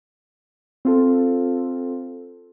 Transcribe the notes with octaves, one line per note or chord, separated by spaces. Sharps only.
C4 F4 A4